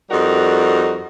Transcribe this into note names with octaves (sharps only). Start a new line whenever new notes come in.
F2 G3 D#4 F#4 A#4